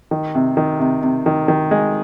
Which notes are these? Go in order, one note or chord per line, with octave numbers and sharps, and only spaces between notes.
D#3
C3
D#3
C3
C3
D#3
D#3
G#3